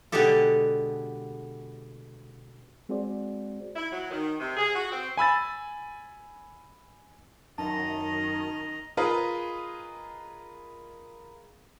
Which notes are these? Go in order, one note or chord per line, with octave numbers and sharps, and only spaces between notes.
B2 D3 G#3 B3 G4 A4
G#3 C4 F#4 G#4 C5 D5
E4
F#3
D#3
C3
G#4
F#4
C4
G#5 B5 E6 A6
F#2 D#3 D#5 A5 A#5
F4 G#4 A#4 B4 D#5